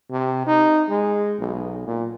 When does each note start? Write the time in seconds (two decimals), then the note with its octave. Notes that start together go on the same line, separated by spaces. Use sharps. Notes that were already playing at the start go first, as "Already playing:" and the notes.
0.11 C3
0.47 D#4
0.89 G#3
1.40 B1
1.87 A#2